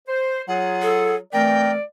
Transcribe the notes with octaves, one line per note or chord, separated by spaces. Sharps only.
C5
F#3 F4 G#4 F#5
A4
E3 A3 C4 A#4 D5 G5